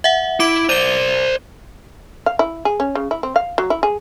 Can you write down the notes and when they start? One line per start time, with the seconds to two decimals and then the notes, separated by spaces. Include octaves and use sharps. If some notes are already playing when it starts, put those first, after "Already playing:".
0.04 E5 F#5
0.40 E4 D6 D7
0.69 C5 D5 D#7 G7
2.26 F5
2.39 E4
2.65 G#4
2.80 C#4
2.95 C#3
3.11 E4
3.23 C4
3.36 F5
3.58 F#3
3.70 E4
3.83 G#4